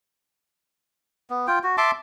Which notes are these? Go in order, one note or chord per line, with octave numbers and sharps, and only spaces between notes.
B3
F4 G5
F#4
E5 A5 C6 D6